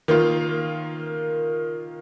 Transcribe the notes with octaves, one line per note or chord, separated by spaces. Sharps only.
D#3 A#3 F4